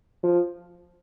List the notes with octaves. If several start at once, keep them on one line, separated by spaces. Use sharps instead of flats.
F3